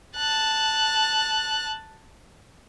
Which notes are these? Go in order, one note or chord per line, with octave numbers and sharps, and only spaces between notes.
A5 F#6